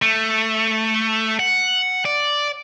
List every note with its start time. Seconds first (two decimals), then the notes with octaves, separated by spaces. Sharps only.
0.02 A3
1.39 F#5
2.05 D5